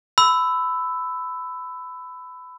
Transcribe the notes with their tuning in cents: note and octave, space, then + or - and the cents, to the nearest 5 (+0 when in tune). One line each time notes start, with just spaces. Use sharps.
B5 +25 E6 +0